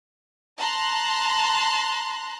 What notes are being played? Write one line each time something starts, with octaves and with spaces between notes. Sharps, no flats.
A5 A#5 C6 F#6